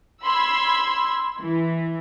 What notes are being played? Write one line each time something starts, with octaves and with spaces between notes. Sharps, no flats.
B5 C6 E6 G#6
E3